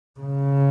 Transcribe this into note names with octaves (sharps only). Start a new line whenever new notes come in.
C#3